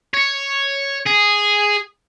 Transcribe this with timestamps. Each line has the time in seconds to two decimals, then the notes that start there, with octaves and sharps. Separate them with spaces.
0.14 C#5
1.07 G#4